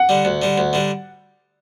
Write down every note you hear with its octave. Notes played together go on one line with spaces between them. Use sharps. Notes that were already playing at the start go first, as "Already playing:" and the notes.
Already playing: F#5
D3 G3
D2
D3 G3
D2
D3 G3